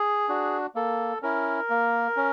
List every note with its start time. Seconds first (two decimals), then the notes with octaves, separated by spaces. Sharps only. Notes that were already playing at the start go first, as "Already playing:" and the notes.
Already playing: G#4
0.29 D4 F#4
0.75 A#3 A4
1.22 C#4 E4 A#4
1.70 A#3
2.17 C#4